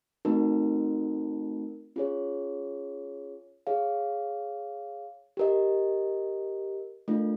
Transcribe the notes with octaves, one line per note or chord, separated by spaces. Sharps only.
A3 C4 D#4 F#4 A#4
C#4 F4 G#4 C#5
G#4 C#5 F5
G4 A#4 D#5
A3 D4 F4 A#4